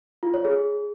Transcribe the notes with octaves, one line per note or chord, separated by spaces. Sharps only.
F4
C#5
G#4